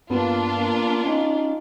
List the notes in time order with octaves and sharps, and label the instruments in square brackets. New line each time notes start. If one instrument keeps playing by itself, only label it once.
[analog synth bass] G2 [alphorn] A#3 [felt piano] B3 [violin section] D4 F4
[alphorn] A#3
[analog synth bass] C#4 [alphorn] D#4